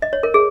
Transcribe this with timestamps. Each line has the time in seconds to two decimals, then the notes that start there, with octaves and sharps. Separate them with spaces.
0.02 D#5
0.13 C#5
0.23 A#4
0.34 G#4